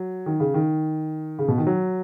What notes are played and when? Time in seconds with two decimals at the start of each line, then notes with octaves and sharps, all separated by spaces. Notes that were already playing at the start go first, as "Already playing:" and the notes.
Already playing: F#3
0.26 D#3
0.40 C#3
0.54 D#3
1.39 C#3
1.48 B2
1.58 D#3
1.67 F#3